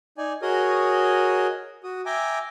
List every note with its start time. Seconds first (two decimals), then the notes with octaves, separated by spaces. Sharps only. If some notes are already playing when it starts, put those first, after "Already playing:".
0.18 D#4 D5 G#5
0.42 F#4 G#4 A#4 C#5 D#5 D#6
1.84 F#4 D#6
2.05 E5 G5 G#5 A#5 D6